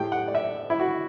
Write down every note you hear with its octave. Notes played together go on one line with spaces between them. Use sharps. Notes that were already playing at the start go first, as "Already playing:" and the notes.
Already playing: A2 G3 G5
F#5
D5
E5
E4
F#4